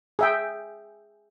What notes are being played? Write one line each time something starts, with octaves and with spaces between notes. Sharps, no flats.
G#4 E5 G5